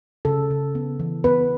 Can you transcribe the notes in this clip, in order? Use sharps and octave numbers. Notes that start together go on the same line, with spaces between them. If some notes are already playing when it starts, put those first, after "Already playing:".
C#3 A4
C#3
B3
E3
B3 B4